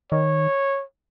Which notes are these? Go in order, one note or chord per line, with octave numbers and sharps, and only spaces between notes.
D#3 C#5